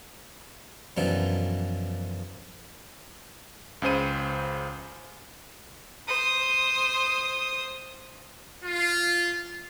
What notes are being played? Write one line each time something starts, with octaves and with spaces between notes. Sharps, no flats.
F#2 B2 E3 F3 D4 D#4
C#2 C#3 C5 D#7
C5 D#6
F4